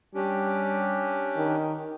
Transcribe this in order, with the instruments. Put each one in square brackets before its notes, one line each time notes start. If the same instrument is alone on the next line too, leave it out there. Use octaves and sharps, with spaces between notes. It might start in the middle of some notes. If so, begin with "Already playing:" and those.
[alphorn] G3 [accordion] C#4 D4 G4
[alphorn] D#3